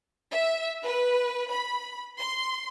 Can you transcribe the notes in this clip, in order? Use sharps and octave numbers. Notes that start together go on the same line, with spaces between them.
E5
B4
B5
C6